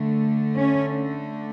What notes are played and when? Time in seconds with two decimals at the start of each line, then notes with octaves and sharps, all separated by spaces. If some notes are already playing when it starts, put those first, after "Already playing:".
Already playing: D3 A3
0.57 C#4